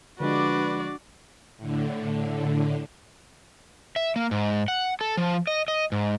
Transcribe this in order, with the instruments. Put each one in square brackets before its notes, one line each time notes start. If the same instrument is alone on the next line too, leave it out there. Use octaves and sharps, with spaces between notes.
[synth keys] D3 F3 G#3 [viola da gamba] D4 [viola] F#4 D5 [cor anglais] B4
[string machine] A2 D3
[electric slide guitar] E5
A#3
G#2
F#5
A4
F3
D#5
D#5
G#2